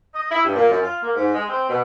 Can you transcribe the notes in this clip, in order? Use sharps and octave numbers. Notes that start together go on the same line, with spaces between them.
D#5
E4
G2
A#2
F#2
F4
A#3
G#2
G#3
C4
B2